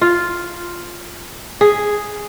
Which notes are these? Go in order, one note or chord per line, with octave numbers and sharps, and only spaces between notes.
F4
G#4